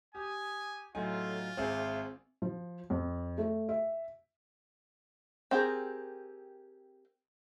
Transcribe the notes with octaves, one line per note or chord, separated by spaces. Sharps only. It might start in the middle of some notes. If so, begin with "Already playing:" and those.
G4 G#5 D#6
A2 F#3 D#4 F4 A4 G#5
G#1 C4 G#4 D5 E5
F3
F2
A3
E5
C4 G4 G#4 A#4